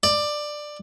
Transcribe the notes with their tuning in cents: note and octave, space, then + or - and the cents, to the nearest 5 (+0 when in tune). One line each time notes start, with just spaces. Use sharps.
D5 +15